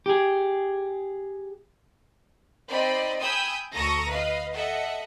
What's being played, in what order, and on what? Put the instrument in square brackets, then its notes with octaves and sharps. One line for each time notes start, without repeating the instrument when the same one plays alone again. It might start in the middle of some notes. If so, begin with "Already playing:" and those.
[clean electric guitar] G4 G#4
[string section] C4 D#4 D5 D#5 B5
G5 G#5 B5 D#6 E6 G6
D2 A4 A#5 C#6 D#6 A#6
B4 D#5 F5
A4 D#5 E5 F#5